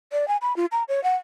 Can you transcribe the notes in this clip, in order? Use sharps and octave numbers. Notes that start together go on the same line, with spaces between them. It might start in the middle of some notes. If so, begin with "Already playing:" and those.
D5
G#5
B5
F4
A#5
C#5
F#5